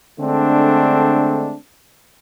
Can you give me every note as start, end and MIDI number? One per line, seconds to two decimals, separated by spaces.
0.20 1.55 50
0.20 1.55 56
0.20 1.55 57
0.20 1.55 60
0.20 1.55 62